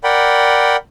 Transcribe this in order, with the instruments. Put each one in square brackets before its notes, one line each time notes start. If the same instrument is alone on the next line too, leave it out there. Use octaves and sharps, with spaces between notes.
[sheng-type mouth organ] A#4 D5 F#5 G5 B5